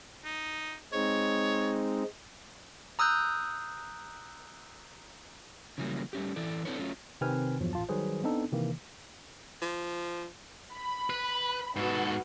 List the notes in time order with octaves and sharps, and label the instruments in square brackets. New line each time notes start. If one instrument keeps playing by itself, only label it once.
[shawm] D#4
[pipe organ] G#3 C4 D#4 [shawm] C#5
[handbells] A#5 D#6 E6 F#6 G6
[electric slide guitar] C#3 E3 F#3 G3 A#3
G3 A3 C#4 G4
E3 E4 A4 D5
C4 D4 E4 A4 B4 C#5
F#3 A3 C#4 F4
[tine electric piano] C3 D#3 C4 B4 G#5 F6
E2 G2 F3 F#3
A1 F4 A5
D#3 F#3 G3 G#4 B4 C5
B3 C4 D4 D#4 A4
C3 D#3 E3 A#3
[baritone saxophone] F3
[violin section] B5
[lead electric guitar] B4
[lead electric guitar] G#2 A4 [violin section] B3 F#4